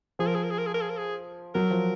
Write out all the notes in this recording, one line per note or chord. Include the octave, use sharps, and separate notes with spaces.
F3 G#4
A#4
G#4
A#4
G#4
A#4
G#4
A#4
G#4
A#4
G#4
F#3 A#4
F3